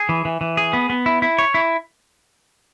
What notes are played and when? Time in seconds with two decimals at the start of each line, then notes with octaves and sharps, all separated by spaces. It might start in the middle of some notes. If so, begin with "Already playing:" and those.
Already playing: G#4
0.09 E3
0.25 E3
0.41 E3
0.57 G#4
0.73 B3
0.90 B3
1.06 E4
1.22 E4
1.39 C#5
1.54 E4